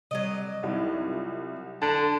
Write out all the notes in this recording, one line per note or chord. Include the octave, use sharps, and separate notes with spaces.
C3 F#3 G3 D5 D#5
C2 D#4 E4
F4
D3 A5